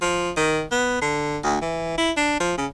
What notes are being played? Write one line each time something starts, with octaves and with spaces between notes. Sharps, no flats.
F3
D#3
B3
D3
D2
E3
E4
D4
F3
C#3